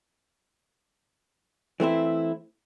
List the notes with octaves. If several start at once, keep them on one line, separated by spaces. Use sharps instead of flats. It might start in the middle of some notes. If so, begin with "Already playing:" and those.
E3 A3 C4 E4